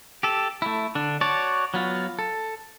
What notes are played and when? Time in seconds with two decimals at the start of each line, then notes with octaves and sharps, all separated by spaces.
0.23 G4 A4
0.62 A3 E4
0.95 D3 D4
1.21 F#4 C#5 D5 A5
1.74 F#3 B3 F4
2.19 A4